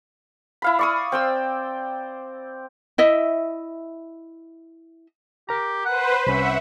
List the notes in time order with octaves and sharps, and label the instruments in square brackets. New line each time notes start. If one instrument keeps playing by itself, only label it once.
[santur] E4 F5 B5
D5 C#6 D#6
C4 G5 E6
[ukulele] E4 D#5 E5
[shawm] G4 [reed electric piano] A#4 A#5
[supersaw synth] B4 C5 [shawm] F#5
[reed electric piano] C2 C#4 C#6 [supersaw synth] E5 F#5 [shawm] B5